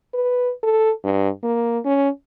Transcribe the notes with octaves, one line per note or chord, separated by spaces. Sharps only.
B4
A4
G2
A#3
C#4